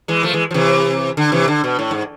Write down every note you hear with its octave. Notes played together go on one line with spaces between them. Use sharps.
E3 G#3
F3 A3
E3 G#3
F3
C3 E3
D3
C3 E3
D3
B2
A2
G#2